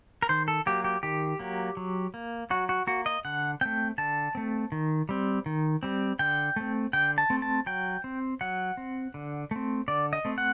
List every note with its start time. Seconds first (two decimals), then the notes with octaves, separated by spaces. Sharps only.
0.22 A#4
0.29 D#3 C5
0.48 A4
0.66 F#3 A#3 G4
0.84 G4
1.03 D#3 G4
1.39 F#3 A#3
1.77 F#3
2.14 A#3
2.50 F#3 F#4
2.69 F#4
2.87 A#3 F#4
3.06 D#5
3.25 D3 F#5
3.61 A3 C4 G5
3.98 D3 A5
4.35 A3 C4
4.72 D#3
5.09 G3 C4
5.46 D#3
5.83 G3 C4
6.19 D3 G5
6.56 A3 C4
6.93 D3 G5
7.18 A5
7.30 A3 C4
7.42 A5
7.66 F#3 G5
8.04 C4
8.41 F#3 F#5
8.77 C4
9.14 D3
9.51 A3 C4
9.88 D3 D5
10.13 D#5
10.25 A3 C4
10.38 F#5